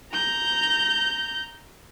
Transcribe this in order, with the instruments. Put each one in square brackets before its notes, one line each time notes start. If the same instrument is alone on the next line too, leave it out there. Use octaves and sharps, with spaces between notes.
[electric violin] A#5 G6